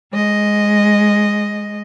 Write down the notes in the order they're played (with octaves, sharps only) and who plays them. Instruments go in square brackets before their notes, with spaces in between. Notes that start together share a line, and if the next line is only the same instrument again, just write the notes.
[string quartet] G#3 D#5